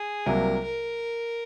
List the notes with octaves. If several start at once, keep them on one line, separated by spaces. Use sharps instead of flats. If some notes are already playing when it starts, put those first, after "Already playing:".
Already playing: G#4
C2 C3 F#3 A#3 A#4
A#4